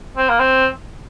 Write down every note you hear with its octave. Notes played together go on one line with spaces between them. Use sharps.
C4
A#3
C4